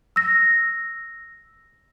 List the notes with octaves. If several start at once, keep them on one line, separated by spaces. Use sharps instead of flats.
E6 A#6